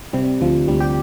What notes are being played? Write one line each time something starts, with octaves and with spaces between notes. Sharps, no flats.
C3 G3
D2 F3
D2 G3
G4